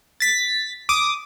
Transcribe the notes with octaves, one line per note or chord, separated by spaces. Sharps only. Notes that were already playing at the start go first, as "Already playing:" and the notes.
A6 B6
D6 D#6